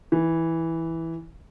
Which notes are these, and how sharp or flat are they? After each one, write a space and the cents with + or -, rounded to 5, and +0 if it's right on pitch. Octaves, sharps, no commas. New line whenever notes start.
E3 -5